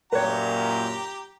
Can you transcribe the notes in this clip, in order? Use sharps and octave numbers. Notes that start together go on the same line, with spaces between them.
F#2 A#2 G4 B4 C#5 G5 A#5